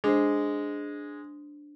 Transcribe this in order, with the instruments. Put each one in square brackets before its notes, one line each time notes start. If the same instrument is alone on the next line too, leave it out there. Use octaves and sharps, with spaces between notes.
[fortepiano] G#3 [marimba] D4 C5